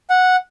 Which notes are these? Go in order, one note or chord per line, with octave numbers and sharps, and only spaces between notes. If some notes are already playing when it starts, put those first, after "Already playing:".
F#5